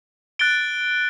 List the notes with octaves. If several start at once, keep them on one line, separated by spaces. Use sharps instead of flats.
F#6 A6 D7 G7